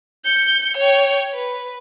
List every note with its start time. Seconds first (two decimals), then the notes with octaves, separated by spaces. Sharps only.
0.25 G6 C#7
0.77 C#5 G5
1.34 B4